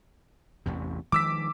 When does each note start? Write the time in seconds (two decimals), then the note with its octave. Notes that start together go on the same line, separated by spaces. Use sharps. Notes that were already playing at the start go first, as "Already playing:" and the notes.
0.66 A1 E2 C3
1.12 D#3 F3 G#3 D6 E6 B6